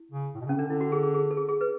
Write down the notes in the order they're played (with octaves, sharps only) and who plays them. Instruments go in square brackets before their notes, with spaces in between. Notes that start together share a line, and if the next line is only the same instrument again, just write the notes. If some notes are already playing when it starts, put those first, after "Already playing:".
Already playing: [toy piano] E4
[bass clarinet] C#3
A2
B2
C#3
[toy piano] C#4
[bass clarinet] D3 [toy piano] D4
[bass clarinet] D3 [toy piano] E4
[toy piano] F#4
G#4
G#4
G#4
A4
G#4
G#4
B4